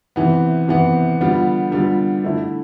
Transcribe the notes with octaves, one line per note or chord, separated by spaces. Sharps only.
C3 E3 B3
C3 E3 B3
D3 G3 B3 F4
D3 G3 B3 F4
D3 A3 E4